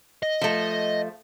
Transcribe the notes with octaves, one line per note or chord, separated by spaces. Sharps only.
D#5
F3 A3